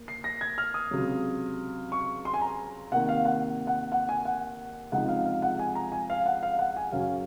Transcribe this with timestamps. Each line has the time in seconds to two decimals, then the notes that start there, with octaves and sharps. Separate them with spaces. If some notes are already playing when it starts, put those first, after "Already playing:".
Already playing: A#3
0.08 C7
0.24 A#6
0.41 G#6
0.58 F6
0.74 D#6
0.91 C#2 C3 F#3 C#4
1.92 C#6
2.25 C6
2.34 G#5
2.42 A#5
2.92 C3 D#3 A#3 F#5
3.09 F5
3.25 F#5
3.67 F#5
3.92 F#5
4.09 G#5
4.25 F#5
4.92 C#2 C3 F3 G#3 D#4 F#5
5.08 F5
5.26 F5
5.42 F#5
5.59 G#5
5.75 A#5
5.92 G#5
6.10 F5
6.26 F#5
6.43 F5
6.59 F#5
6.76 G#5
6.92 F#2 C#3 F#3 C#4 F5